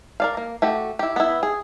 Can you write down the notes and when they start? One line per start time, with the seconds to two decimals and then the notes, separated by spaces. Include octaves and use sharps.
0.20 A#4 D5 F5
0.37 A#3
0.62 A3 F#4 G4
0.99 E4 G4
1.16 B3 E4
1.43 G#4